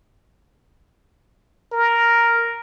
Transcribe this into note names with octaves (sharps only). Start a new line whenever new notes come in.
A#4